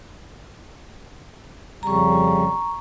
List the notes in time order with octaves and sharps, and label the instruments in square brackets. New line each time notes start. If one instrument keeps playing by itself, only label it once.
[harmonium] F2 C#3 G3 [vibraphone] A#5 C#6